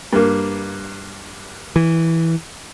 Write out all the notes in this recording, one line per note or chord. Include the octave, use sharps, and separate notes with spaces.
G2 A#3
E3